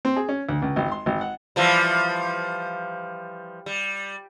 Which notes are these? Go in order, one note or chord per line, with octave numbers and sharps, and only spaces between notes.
C4
G#4
C#4
D2
C#2
G#1
C6
G#1
F#5
E3 F3 G3
G3